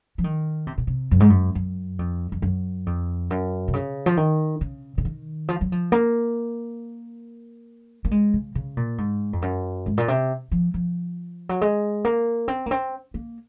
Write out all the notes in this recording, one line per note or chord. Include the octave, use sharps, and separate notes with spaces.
F3
D#3
C3
A#2
C3
F#2
G#2
F#2
F#2
F2
F2
F#2
F2
F#2
C3
C#3
F3
D#3
C#3
C#3
D#3
F3
F#3
F3
A#3
A#3
G#3
C#3
C#3
A#2
G#2
F2
F#2
G#2
A#2
C3
F3
F3
F#3
G#3
A#3
C4
A#3
C4
A#3